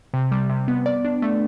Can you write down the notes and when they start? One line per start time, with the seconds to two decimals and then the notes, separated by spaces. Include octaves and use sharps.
0.14 C3
0.32 G3
0.49 C3
0.68 B3
0.86 D5
1.05 D4
1.22 A3